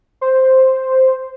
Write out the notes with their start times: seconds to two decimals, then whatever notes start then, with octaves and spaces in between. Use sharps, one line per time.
0.21 C5